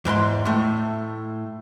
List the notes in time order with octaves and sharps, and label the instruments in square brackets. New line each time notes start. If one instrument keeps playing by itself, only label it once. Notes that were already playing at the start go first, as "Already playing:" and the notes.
[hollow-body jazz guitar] E2 G#2 A#5 C6
A2 A3